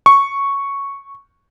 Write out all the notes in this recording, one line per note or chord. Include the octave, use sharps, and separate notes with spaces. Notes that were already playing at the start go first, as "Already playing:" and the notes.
C#6